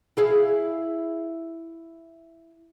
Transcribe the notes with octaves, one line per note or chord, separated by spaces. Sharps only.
E4 G#4 F5